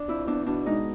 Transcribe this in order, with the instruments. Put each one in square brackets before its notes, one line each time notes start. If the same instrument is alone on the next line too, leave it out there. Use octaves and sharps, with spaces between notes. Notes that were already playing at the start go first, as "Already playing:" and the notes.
Already playing: [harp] D4
F2 E4
E2 D4
B2 D4
G#3 D#4